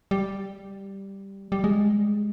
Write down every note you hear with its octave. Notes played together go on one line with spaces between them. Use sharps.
G3
G3
G#3